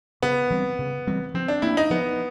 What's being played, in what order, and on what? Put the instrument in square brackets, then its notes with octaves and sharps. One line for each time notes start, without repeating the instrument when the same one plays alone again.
[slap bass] C#3 [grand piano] B3
[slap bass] E3 G3 C4
C#3
E3 G3 C4
[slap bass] F3 [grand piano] C4
[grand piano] D4
[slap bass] A#3 D4 [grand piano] E4
[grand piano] D#4
[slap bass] F3 [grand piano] B3